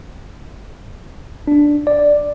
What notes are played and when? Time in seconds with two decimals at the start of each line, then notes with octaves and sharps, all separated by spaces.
1.47 D4
1.87 D5